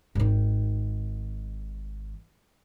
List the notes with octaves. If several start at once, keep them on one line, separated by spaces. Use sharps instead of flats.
G#1 D#3